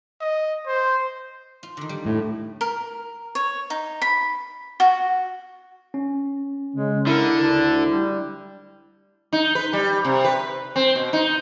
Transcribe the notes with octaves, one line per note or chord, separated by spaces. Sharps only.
D#5
C5
F4
D3 D#3
G3
A2
A#4
C#5
D#4
B5
F#4
C#4
C#3 G#3
D3 E4 A#4
D2 D4
G3
D#4
B4
G3
C3
B4
C4
B2
D#4